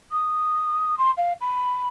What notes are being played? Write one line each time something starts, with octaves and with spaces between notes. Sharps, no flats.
D#6
C6
F5
B5